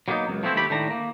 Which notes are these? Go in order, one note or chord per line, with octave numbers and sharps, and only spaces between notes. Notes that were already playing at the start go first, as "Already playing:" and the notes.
F#3 G3 A#3 B3 D#4
C#2 F#2
F3 A3 B3 C4 E4
D#2 A3 G4 B5
A2 D#3 D4 A#5
A#3